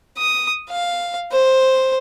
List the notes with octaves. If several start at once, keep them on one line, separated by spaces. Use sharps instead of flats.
D#6
F5
C5